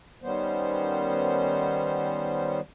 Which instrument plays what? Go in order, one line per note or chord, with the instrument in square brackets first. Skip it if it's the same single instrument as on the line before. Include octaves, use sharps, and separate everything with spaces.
[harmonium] D#3 G3 B3 C#4 C5